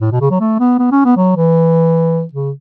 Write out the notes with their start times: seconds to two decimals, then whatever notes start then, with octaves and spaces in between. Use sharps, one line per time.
0.01 A2
0.12 B2
0.21 C#3
0.31 F#3
0.40 A3
0.60 B3
0.79 B3
0.92 C#4
1.05 B3
1.17 F#3
1.37 E3
2.33 C#3